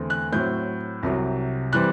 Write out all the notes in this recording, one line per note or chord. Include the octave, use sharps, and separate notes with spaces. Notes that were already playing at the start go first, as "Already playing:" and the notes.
Already playing: E2 D3 A3 C4
F#6
A2 F#3 C4 G6
C2 C3 F#3
E3 G3 C4 F#6